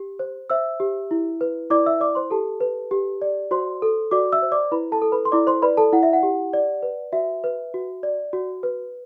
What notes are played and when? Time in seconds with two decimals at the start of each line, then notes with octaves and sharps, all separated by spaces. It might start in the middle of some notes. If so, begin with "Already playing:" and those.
Already playing: G4
0.19 C5
0.50 C5 E5 E6
0.80 G4
1.11 E4
1.41 B4
1.70 E4 D5 D6
1.86 E5 E6
2.00 D5 D6
2.15 C5 C6
2.31 G4 A4 A5
2.60 B4
2.91 G4
3.22 D5
3.51 F#4 C5 C6
3.82 A4
4.11 F#4 D5 D6
4.32 E5 E6
4.42 C5
4.52 D5 D6
4.71 E4 B4 B5
4.92 A4 A5
5.02 A4
5.12 B4 B5
5.25 C6
5.32 E4 D5 D6
5.47 C5 C6
5.62 B4 D5 B5
5.77 A4 A5
5.93 E4 F#5
6.03 E5
6.13 F#5
6.23 G4
6.53 D5
6.83 B4
7.13 F#4 E5
7.44 B4
7.74 F#4
8.03 D5
8.33 F#4
8.63 B4